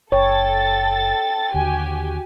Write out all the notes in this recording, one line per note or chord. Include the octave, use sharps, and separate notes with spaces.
F#1 A4 C#5 G5 A6
D#2 D3 F#4 G4 G#5